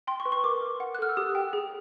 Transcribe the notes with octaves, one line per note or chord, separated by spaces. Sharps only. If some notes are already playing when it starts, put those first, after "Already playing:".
G5 C6
C#6
B4
C#6
A#4 D6
A#4
F#5
F#6
A4 F6
E6
G4 D#6
G5
G#4